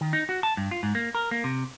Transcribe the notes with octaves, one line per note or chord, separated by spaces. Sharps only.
D#3
D#4
F#4
A5
G2
F4
G#2
A#3
A#4
A#3
C3